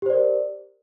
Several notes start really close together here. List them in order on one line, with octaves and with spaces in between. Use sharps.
G4 C5 D5 A#4